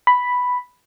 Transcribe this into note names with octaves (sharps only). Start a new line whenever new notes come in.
B5